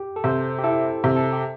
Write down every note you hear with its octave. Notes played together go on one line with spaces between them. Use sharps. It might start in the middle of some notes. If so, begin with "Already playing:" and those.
Already playing: G4
A4
C3 C5
G4
E4 A4
C3
A4
G4